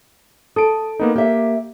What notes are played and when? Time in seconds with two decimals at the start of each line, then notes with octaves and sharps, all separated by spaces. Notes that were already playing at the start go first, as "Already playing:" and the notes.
0.56 A4 D#6 D7
1.00 A#3 B3 D#4
1.16 A#3 G4 E5